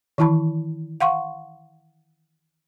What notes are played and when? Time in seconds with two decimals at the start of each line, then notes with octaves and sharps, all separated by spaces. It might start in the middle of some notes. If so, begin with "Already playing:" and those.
0.18 D#3 E3 E4 A5 B5
1.00 F5 F#5 C6 C#6